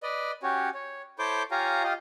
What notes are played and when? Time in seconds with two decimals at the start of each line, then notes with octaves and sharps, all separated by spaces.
0.03 B4 D5 D#5
0.43 C#4 F#4 G4 C#5
0.74 C#5
1.19 E4 A4 C5 C#5 D6 G6
1.51 F4 G4 C#5 F5 G#5 A#5
1.84 F4 G4 D#5 F5